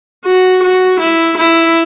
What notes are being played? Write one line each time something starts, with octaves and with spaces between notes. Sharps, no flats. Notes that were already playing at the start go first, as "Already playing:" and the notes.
F#4
F#4
E4
E4